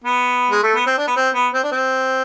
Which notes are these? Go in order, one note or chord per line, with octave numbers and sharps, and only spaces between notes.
B3
G#3
A3
B3
C4
D4
B3
C4
B3
C4
D4
C4